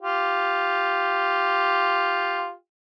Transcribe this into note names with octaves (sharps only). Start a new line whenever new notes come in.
F4 G4